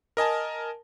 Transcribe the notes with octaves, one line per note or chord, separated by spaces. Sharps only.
A#4 D#5 G#5 A5